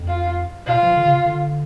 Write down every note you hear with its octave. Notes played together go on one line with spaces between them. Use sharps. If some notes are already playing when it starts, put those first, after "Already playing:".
Already playing: F2
F4
B2 F4
F3
D3
C#3
D3